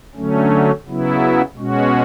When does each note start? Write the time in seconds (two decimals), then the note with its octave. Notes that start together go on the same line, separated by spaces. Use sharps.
0.15 D3 F#3 A3 C#4
0.86 C#3 F#3 B3 E4
1.56 B2 G#3 C#4 F#4